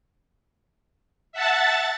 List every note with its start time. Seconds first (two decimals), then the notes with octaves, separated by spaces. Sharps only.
1.32 E5 F#5 A5 A6